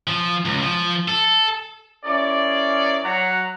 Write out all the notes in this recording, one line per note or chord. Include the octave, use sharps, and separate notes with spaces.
F3
C#2
F3
A4
C#4 E4 G#4 A#4 D5
F#3 F#5 A#5